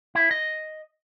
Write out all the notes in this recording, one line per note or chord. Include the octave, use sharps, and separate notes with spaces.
E4
D#5